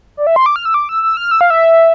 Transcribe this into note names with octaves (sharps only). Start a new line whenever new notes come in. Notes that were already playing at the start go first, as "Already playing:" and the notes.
D5
E5
C6
D6
F6
E6
D6
E6
E6
F6
E6
F5
E5